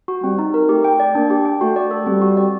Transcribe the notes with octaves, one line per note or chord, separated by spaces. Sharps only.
F#4
G3 C4
D#4
A#4
A3 G4
G5
D5
A#3 D4
G4
G5
A3 F#4
D5
A4
G3 C4
F#4
D5